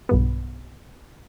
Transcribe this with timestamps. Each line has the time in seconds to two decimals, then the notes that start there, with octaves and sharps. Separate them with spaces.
0.09 B1 G2 B3